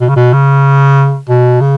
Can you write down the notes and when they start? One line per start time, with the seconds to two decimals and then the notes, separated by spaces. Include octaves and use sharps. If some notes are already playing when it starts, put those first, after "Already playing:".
0.01 B2
0.09 C#3
0.16 B2
0.33 C#3
1.29 B2
1.61 C#3